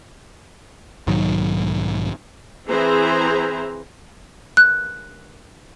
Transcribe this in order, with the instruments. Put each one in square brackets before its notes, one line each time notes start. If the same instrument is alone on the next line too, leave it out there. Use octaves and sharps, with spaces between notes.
[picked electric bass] B1 G#2 D#3 F#3
[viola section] E3 C4 E4 G#4 C5 A#5
[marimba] F#6